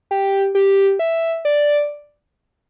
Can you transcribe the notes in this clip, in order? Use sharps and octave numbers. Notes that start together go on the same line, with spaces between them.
G4
G4
E5
D5